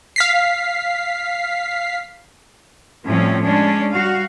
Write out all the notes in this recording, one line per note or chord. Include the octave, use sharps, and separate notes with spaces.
F5 B6 C7
A2 F3 G3 C4 C#4
G#3 C#4 D4
G3 F#4 F5